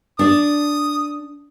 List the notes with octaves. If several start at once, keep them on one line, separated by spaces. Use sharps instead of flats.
D4 D5 D#6